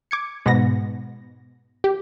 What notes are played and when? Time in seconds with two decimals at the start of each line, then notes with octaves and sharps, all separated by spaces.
0.11 D6 G#6 C#7
0.46 G#2 B2 B3 A#6
1.84 G4